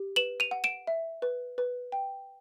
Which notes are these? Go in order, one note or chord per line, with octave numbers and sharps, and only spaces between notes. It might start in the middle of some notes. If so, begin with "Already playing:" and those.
Already playing: G4
B4 E7 F#7
D#7 F7
F#5
D7 E7
E5
B4
B4
G5